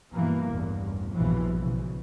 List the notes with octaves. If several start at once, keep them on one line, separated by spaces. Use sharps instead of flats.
G2 B2 E3 A#3
A1 E2 G2
A#1 G2 B2 E3 F3
B1 C#3